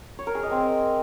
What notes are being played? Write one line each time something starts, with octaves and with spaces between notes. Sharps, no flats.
C#5
A#4
G#4
D#5
C4